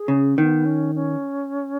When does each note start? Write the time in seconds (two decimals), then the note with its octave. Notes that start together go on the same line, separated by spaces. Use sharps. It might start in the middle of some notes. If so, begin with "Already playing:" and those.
Already playing: G#4
0.08 C#3
0.38 D#3 B3
0.65 C#4
0.95 C#4